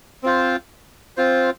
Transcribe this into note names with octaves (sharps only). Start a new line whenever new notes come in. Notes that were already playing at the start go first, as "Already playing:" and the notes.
C4 F4 C5
C4 F4 C5